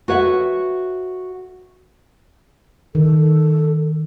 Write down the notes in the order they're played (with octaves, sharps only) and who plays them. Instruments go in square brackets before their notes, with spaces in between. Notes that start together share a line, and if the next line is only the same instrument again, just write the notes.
[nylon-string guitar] F#4 A4 B4 C#5 E5 F#5
[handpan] D#3 [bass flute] A4